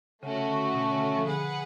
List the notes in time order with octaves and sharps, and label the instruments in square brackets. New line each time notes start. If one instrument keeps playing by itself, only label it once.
[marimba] C#3 [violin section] A3 C#4 F#4
[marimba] C#3
D3
B2
D3
C#3
F3
[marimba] D3 [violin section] G#4 B4 F#5